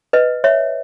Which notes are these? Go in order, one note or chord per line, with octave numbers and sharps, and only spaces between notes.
B4 D#5
C#5 E5